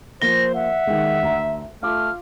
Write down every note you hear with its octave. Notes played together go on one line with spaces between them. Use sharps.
F3 A#3 C5 A#6 G7
E5 F#5
D#3 G#3
D2 A#5
A3 F4 D6 F6